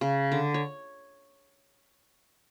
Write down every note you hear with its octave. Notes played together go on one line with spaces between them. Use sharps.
C#3
D3
C#5